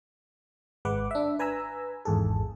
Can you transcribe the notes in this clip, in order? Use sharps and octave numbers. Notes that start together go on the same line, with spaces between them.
G#1 G#3 B4 F#5 D6
D4 E5
B4 G#5 A#5 B5 E6
G#1 E2 G#2 G#4 A4